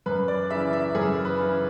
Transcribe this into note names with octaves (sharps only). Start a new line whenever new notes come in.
F#2 B4
D5
C#3 E3 E5
E5
F#2 G#4
B4
C#3 E3